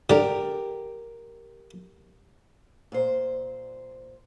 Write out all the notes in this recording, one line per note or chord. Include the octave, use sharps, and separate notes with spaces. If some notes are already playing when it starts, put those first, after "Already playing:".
D3 G4 A#4
A#2 C5